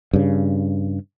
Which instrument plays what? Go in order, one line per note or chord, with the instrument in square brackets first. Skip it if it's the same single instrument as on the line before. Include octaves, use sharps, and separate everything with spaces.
[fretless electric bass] G2 C#3